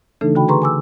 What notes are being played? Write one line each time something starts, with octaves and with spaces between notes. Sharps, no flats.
C#3 E3 A3 D4 D#4 A4
D3 F#4 G5 B5
G#4 B4 A#5 C6 C#6
G#5 D6 E6